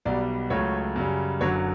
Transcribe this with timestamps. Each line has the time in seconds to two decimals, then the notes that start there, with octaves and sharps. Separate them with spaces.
0.05 B1 B2 G3 D5
0.50 C#2 C#3 F#3 A3 C#5
0.96 F#2 C#3 G3
1.41 F#1 F#2 D3 F#3 C#5